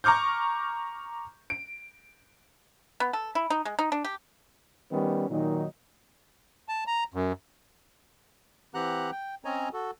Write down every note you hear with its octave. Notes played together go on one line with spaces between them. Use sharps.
A#5 C#6 D6 F6 G6
D7
B3
A4
E4
D#4
G#3
D#4
D4
G4
D#3 G3 B3 C#4
A#2 D#3 F#3 D#4
A5
A#5
F#2
E3 C4 G4 F#5 A#5 F#6
G5
C4 C#4 C#5 D#5 G#5 A#5
F#4 A4